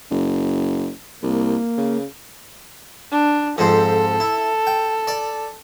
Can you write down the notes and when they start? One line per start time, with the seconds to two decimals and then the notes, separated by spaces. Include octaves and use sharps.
0.10 F#1
1.23 C2 A#3
1.77 C#3
3.11 D4
3.58 F2 G#2 A4 C5
4.20 E4
4.67 G5
5.07 D5